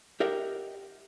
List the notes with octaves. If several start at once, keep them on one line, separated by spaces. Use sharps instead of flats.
G4 A#4 D#5 E5 F#5 G5